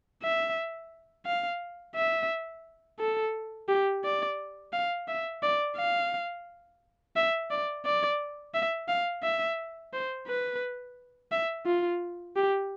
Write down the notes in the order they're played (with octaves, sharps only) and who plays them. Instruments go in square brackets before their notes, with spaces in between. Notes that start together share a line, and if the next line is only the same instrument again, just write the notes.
[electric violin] E5
F5
E5
A4
G4
D5
F5
E5
D5
F5
E5
D5
D5
E5
F5
E5
C5
B4
E5
F4
G4